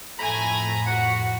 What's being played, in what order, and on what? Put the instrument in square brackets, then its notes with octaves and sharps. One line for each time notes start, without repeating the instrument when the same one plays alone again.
[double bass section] F2 A2 [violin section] A3 G#5 A#6 [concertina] A#5 B5
[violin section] F#4 [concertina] F#5